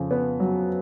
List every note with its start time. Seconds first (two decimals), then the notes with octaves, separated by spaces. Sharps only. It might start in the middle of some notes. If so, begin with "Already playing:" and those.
Already playing: F2 C#3
0.11 B3
0.40 F#3